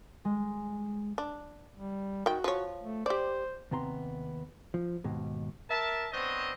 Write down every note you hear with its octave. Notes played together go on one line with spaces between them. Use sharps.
G#3
D4
G3
D#3 F#4 G5
F3 C#5
A3
G4 C5 D5
D#2 C3 B3 A#5 C6
F3
D#2 G#2 B2
A#4 E5 A5
B3 C4 D4 C5 C#5 D#5